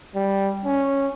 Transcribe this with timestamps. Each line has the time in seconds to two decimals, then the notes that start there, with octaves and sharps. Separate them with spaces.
0.15 G3
0.65 C#4